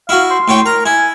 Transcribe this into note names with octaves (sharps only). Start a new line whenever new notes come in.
E4 F#4 F5
C6
A2 C#5 G5
A#4 A#5
E4 G#5